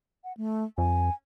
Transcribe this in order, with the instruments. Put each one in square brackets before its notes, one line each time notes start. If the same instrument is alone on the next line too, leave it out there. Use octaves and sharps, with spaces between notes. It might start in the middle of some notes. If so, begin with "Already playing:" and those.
[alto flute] F#5
A3
[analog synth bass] F2 [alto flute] G#5